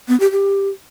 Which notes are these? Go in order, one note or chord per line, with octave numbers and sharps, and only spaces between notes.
B3
G4
G4